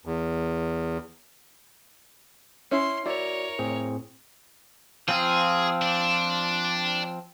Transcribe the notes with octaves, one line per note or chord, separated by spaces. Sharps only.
E2
C#4 E4 C6
E4 F#4 A#4 C#5 D5
A2 C4 G#4
F3 C4 F4 G#4
D4